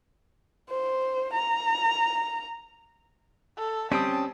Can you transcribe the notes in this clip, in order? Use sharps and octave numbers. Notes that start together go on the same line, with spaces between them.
C5
A#5
A4
G3 C4 C#4 G5 A5 D#6